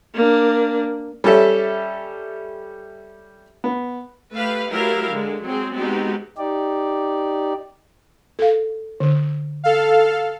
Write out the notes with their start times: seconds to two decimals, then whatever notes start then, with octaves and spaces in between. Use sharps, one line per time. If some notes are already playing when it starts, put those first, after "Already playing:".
0.14 A#3 D4
1.24 G3 C#4 A4 E5
3.64 B3
4.33 A3 G4 B4 F5
4.70 F#3 A3 E4 G4 A#4 F5
5.11 D3 G#3
5.44 F#3 G#3 C4 G#4
5.75 G#3 B3 C4 D#4 F#4 G4
6.37 D#4 G4 D5
8.39 A4 F5
9.00 D3
9.64 A4 F5